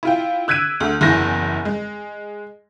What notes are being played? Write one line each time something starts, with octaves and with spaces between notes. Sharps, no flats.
E4 F4 G5
E6 F#6 G#6 B6 D7 D#7
D2
F#1 E2 E4 A#6
G#3